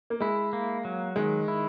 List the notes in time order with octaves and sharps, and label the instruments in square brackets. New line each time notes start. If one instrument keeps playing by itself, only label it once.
[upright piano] A#3
[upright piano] G#3 [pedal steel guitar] E4
[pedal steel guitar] A#3
F#3
[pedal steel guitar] D#3 [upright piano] G#3
[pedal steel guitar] E4